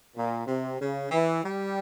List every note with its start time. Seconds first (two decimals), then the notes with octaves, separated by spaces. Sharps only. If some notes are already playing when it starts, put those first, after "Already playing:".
0.16 A#2
0.47 C3
0.80 C#3
1.11 E3
1.44 G3